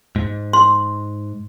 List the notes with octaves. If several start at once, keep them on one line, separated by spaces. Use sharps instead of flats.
G#2
C6